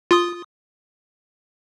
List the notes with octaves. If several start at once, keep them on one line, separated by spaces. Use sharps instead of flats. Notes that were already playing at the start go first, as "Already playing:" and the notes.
F4 C6 D#6